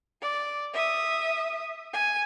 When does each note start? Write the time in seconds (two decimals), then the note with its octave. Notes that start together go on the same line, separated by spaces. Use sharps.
0.21 D5
0.73 E5 D#6
1.93 G#5